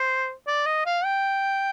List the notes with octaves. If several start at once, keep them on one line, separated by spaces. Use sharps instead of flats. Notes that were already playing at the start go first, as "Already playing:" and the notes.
Already playing: C5
D5
D#5
F5
G5